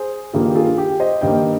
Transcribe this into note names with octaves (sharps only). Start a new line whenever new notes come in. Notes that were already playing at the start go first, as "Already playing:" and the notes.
Already playing: G#4 C5
G2 D#3 A#3 F4 G#4
G4
F4 G#4
G4
C5 D#5
G2 D#3 A#3 D#5 G5